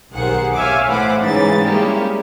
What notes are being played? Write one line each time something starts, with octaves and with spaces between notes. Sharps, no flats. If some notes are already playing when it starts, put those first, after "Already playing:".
B1 D#3 G4 G#4 C5 F#5
C#5 E5 F5 G#5 D6 E6
A2 E3 C5 F#5 B5 D6
G#2 C#3 E3 F#3 D#4 A6
G3 G#3 A#3 C#4 E4 G4